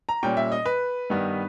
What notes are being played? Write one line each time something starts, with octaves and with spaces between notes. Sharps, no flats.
A#5
A#2 G3 C#4 G5
E5
D#5
B4
G2 D#3 G3 B3